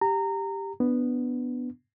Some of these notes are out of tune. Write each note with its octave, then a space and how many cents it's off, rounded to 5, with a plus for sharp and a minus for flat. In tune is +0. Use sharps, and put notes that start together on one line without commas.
G4 +0 A#5 -20
B3 +0 D4 +0